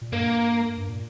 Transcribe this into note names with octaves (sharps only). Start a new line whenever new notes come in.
A#2
G2 A#3
G2
A#2